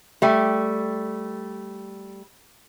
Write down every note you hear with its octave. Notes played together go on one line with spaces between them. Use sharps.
G3 A3